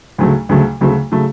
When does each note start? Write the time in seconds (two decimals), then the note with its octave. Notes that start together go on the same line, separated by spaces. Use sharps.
0.18 D2 C#3 F#3 A3
0.49 D2 C#3 F#3 A3
0.81 D2 C#3 F#3 A3
1.11 C#3 F#3 A3